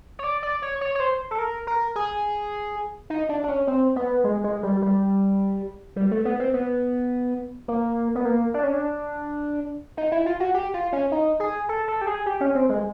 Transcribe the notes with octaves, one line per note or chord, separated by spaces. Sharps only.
C#5
D5
D5
C#5
C#5
C#5
C5
A4
A#4
A#4
G#4
D#4
D4
D4
C#4
C4
B3
G#3
G#3
G3
G3
G3
A3
B3
C4
B3
A#3
B3
A#3
D4
C#4
D4
D#4
E4
F4
F#4
G4
F4
C#4
D#4
G#4
A4
A4
G4
G#4
G4
C#4
C4
G#3